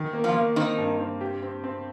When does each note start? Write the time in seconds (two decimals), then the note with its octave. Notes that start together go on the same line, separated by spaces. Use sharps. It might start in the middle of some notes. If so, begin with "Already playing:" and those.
Already playing: D#3
0.13 A#3
0.24 F3 F4
0.35 A#3
0.56 D#3 C4 D#4
0.78 G2
1.00 C4
1.21 G4
1.42 C4
1.64 C4